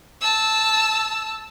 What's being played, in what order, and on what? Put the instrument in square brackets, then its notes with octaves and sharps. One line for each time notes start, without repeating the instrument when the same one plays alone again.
[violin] A5 E6